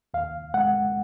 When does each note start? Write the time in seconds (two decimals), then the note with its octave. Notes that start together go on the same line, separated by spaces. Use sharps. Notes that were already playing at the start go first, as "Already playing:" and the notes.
0.14 D#2 F5
0.54 G#3 F#5